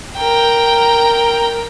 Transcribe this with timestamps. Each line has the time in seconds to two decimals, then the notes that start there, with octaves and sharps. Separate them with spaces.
0.17 A#4 G5